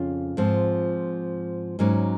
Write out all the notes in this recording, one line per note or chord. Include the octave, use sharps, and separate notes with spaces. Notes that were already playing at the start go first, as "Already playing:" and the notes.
Already playing: F2 C#3 C#4 F4
G#2 F3 C4
G#2 F#3 A#3 C#4